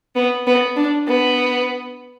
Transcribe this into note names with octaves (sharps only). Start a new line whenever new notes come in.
B3
B3
D4
B3